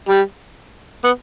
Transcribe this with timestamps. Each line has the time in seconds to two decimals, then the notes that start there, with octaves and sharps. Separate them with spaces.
0.08 G3
1.04 B3